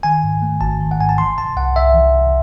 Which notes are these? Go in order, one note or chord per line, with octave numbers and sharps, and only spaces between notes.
D#3 G#5
G#2
A3
G#1 A5
D#3
F#5
G#2 G#5
A5
E3 C6
C3 A5
C2 F#5
C2 E5
E3
C3